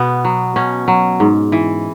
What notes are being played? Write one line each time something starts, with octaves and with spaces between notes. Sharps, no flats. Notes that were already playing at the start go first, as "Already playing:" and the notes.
Already playing: B2 B3
F#3
B2 C#4
F#3
G#2
E3